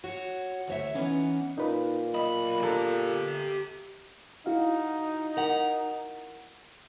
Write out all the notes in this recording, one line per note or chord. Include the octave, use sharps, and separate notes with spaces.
F#4 C#5
D2 C#5 E5
E3 B3 C#4 D#4
A#2 D#4 B4
B1 D#5 B5
G4 A4 A#5
D#4 E4 F#4 F5
A#4 F#5